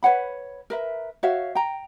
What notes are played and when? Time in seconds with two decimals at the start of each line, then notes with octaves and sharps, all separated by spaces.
0.03 B4 C#5 F#5 B5
0.70 A#4 B4 E5
1.23 F#4 C#5 E5 F5
1.55 G5 A#5